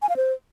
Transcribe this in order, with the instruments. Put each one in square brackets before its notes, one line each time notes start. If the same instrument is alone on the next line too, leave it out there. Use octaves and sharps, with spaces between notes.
[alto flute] G#5
F5
C5